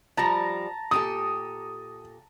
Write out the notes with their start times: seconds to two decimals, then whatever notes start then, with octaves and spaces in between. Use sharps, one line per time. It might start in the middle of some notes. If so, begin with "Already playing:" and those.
0.17 F3 G3 A5 A#5
0.91 A#2 G4 A4 D#6